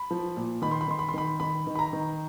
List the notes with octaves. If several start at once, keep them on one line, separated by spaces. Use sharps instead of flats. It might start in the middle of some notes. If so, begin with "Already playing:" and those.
Already playing: B5
F3
A#2
D#3 B5
C6
B5
D#3 C6
B5
C6
D#3 B5
D#3 B5
D#3
B5
A#5
D#3